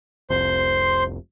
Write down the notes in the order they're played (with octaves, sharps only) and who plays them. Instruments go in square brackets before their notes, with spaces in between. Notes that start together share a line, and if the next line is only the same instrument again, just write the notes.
[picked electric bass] F1 C2 [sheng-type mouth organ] C5 C6